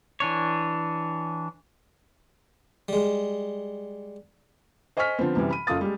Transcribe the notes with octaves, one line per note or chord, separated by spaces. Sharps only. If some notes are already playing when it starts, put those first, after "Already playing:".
E3 D4 C#5
G3 G#3
C5 D#5 G#5 C#6 F6 B6
D3 F3 B3 C4
F#2 C3 E3 G3
B5 D#7
F#1 F4 A4 D#6 A6
G3 G#3